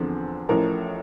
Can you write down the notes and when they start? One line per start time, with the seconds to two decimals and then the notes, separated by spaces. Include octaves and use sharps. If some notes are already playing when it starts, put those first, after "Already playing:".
Already playing: E2 D3 F3 C4
0.49 A1 A2 F3 A#4